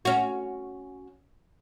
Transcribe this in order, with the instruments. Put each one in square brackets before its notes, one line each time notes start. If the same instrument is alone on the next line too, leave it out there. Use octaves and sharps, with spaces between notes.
[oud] C#4 F#4